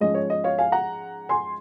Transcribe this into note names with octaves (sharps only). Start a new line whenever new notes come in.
G#2 F3 G#3 C#4 D#5
C#5
D#5
C#5 F5
F5 G#5
F#5 A#5
G#5 C6